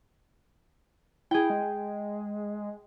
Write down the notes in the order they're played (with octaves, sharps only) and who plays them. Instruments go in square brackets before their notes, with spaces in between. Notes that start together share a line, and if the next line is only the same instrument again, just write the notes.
[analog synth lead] E4 [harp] G#4 G5
[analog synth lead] G#3